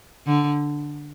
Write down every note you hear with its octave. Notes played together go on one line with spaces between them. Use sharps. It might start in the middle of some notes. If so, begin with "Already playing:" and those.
D3